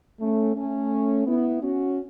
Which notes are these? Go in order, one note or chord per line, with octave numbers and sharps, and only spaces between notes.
A3 C#4
A3 C#4
B3 E4
C#4 F#4